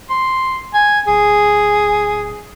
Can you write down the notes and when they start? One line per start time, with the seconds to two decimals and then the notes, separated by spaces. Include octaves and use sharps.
0.10 C6
0.74 G#5
1.08 D1 G#4